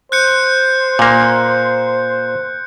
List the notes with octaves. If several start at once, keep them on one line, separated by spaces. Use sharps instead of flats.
C5 F#6 G6 C#7
A#2 A#3